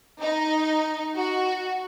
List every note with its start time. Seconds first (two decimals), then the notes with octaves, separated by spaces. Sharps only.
0.22 D#4
1.18 F#4